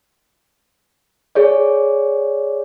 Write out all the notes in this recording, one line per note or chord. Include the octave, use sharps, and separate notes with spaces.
G#4 C#5 D5